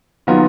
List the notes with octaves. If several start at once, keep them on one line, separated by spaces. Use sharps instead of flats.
D#3 F#3 B3 F4